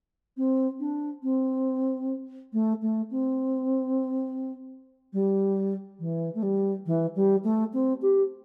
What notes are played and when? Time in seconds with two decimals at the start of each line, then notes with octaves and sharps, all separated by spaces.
0.37 C4
0.80 D4
1.23 C4
2.53 A3
2.82 A3
3.10 C4
5.13 G3
5.99 E3
6.34 A3
6.42 G3
6.86 E3
7.15 G3
7.44 A3
7.73 C4
8.02 G4